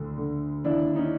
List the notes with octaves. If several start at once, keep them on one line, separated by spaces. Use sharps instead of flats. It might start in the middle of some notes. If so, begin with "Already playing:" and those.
Already playing: D2 D3
D3
D#2 D4 E4
C#4 D#4